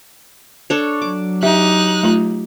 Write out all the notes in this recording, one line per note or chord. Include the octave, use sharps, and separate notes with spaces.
D4 A4 C#5
F#3 D6
D#4 G4 E5 F#6
A3 F4